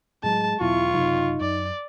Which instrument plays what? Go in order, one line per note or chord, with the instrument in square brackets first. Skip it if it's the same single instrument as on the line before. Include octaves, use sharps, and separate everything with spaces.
[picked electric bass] A2 F#3 [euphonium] G#3 [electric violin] A5
[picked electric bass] E2 B2 F#3 [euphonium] E4 [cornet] F4 [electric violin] C#6
[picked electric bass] F#1 C3 F#3 [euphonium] D#4
[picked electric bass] F#2 [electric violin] D5